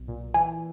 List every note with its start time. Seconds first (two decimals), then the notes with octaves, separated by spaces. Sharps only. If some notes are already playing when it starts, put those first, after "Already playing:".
Already playing: B1
0.08 A#2
0.34 E3 G#5